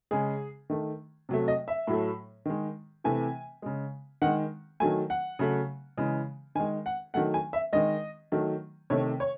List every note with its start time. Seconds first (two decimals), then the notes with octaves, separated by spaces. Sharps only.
0.11 C#3 G#3 G#4
0.70 D#3 A3
1.29 C3 F#3 A3
1.48 D#5
1.68 E5
1.87 A2 F#3 A3
2.45 D#3 G#3
3.04 C3 E3 A3 G#5
3.62 C#3 G#3
4.22 D#3 G#3 F#5
4.80 D#3 F#3 A3 G#5
5.10 F#5
5.39 C#3 F#3 A3
5.97 C#3 E3 G#3
6.55 D#3 G#5
6.60 G#3
6.86 F#5
7.14 D#3 F#3 A3 F#5
7.34 G#5
7.53 E5
7.73 D#3 G#3 D#5
8.32 D#3 F#3 A3
8.90 C3 D#3 A3 C#5
9.20 C#5